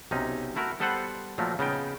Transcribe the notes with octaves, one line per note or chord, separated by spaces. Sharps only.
B1 C3 C#4 D#4
A3 E4 F#4 A#4
G3 B3 A4 B4 C5 F#5
A#2 F3 F#3 A3 A#3
C#3 B3 D#4 G5